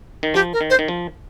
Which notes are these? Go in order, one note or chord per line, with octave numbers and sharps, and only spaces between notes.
D#3
F3 G4
A#4
D#3
C5
D#3
F3